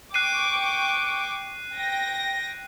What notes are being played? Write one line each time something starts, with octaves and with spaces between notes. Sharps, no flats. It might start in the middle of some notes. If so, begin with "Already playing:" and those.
G5 C#6 D6 F#6 C7 D#7
G5 A#6